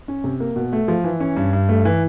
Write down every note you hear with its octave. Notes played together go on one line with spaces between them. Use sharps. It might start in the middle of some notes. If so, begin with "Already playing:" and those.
C#4
C3
A#3
B2
A3
F3
E3
C#4
G2
G2
A3
E3